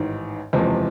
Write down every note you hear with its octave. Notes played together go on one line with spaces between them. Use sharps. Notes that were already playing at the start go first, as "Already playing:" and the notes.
Already playing: A1 G#2 D#3
F#1 E2 C3 F3 G#3